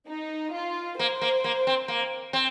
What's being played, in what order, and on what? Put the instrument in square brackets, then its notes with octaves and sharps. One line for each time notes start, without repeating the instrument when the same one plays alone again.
[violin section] D#4
F4
[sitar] A#3 [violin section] C5
[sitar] A#3
A#3
C4
A#3
C4